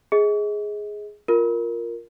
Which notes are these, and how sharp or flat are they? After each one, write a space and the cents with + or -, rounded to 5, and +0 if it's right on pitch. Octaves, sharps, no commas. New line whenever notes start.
G#4 +0 D#5 +35
F4 +0 A#4 +0